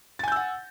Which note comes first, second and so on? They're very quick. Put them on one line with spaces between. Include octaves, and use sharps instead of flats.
A6 G#5 G6 E6 F#5